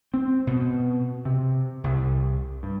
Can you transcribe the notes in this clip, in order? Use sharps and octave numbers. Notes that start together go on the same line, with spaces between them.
C4
B2
C3
C2
G2